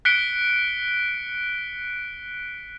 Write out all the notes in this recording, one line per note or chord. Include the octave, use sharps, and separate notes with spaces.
F#6 B6 C#7 D7 G7